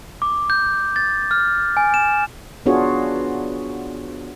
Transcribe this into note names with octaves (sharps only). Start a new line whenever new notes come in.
D6
G6
A6
F6
G#5
E7
B3 D4 F4 F#4 G#4 C#5